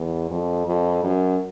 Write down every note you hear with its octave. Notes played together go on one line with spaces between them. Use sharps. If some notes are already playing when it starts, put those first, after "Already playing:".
Already playing: E2
F2
F2
F#2